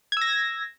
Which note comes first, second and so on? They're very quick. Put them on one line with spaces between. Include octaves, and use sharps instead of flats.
G#6 E6 A#6